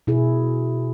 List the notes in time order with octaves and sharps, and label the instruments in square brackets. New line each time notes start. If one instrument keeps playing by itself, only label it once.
[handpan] B2 E4 G#4